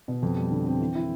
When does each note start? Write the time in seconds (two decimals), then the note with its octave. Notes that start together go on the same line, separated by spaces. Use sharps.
0.08 B2
0.23 F2
0.37 G3
0.51 D3
0.66 C4
0.80 E3
0.95 E4